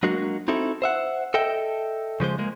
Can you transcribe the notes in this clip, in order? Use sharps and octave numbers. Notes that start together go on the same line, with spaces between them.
F#3 G#3 A#3 D4 F#4
C4 D#4 E4 F#4 A4
C5 E5 F#5
A4 D#5 E5 G5
C#3 F3 G#3 C5
G#3 A#3